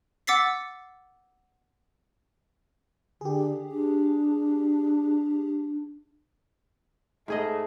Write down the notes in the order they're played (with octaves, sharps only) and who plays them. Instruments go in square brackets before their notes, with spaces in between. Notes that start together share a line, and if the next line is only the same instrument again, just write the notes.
[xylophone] F#5 D6 E6 A6 B6 C7
[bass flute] D3 [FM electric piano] G4 G#4
[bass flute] D4
[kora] G#2 G#4 D#5 [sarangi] A3